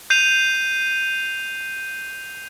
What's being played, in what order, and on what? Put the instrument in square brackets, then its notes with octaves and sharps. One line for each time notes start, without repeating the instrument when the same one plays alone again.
[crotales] G6 C7 D#7 F7